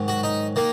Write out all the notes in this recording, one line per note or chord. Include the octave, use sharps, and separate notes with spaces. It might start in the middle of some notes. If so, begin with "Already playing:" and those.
Already playing: G#2 D#3 F#3
F#4
D#4
D#3 A#3